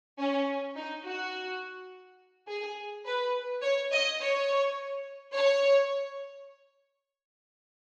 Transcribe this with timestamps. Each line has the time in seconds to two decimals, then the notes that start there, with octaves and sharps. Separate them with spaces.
0.19 C#4
0.77 D#4
1.05 F#4
2.48 G#4
3.05 B4
3.62 C#5
3.92 D#5
4.20 C#5
5.34 C#5